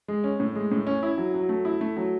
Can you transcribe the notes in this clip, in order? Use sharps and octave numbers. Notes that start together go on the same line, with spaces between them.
G#3
C#4
A2
G#3
A2
C#4
E4
F#3
F#3
A3
E4
A3
F#3